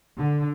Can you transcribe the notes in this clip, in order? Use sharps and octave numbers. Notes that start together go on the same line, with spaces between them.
D3